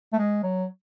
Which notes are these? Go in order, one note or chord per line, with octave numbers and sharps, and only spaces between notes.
A3
G#3
F#3